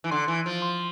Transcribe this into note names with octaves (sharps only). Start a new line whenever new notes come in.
E3
D3 C6
E3
F3
C6